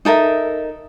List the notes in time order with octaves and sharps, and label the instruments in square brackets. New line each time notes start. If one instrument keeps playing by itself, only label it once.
[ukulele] D#4 A4 A#4 E5